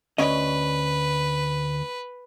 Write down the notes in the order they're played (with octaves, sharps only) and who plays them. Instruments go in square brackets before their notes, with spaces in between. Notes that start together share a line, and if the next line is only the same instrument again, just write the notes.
[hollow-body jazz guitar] D2 C#4 D#5 [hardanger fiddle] B4